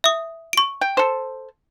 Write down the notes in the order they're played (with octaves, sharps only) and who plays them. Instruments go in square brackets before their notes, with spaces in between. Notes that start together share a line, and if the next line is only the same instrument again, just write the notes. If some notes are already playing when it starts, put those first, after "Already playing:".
[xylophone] E5 D#6
C#6 D7
[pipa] G5
A4 C5